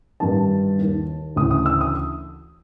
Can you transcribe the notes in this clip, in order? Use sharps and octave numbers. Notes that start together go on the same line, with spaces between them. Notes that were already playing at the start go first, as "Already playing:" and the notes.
G2 D#3 A5
D#2 D#3
D2 C#3 E3 D#6
D#6
E6
D#6